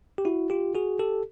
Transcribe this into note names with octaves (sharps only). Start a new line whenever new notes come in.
G4
E4 F#4
F4 G4
F#4 G#4
G4 A4